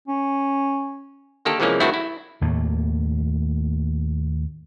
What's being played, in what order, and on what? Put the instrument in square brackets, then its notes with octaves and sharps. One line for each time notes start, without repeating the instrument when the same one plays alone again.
[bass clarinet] C#4
[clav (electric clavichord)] D3 D#3 A#3 G4 A4
C3 E3 F3 G#3 A#3 C#4
G2 D#3 A3 C4 E4 F#4
E4
[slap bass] D#2 A2 A3 A#3